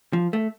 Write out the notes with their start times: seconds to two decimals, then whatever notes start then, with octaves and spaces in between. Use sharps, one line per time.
0.13 F3
0.33 A3